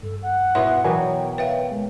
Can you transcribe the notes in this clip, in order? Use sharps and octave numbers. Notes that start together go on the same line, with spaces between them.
G2 A4
F#5
B2 B3 E4 C#5 E5 C6
B2 E3 F#3 B3 A#4 C#5 G5 G#5
B4 E5 F5
G#3